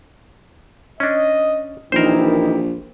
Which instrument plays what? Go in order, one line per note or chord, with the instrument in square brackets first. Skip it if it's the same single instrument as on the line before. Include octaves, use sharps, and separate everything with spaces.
[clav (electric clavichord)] C#4 D4 [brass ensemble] D#5
[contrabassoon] A#1 [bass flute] D#3 [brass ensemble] E3 E4 G4 [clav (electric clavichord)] A#4 C5